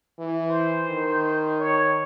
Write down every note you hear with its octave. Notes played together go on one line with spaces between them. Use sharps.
E3
C5
D#3
C#5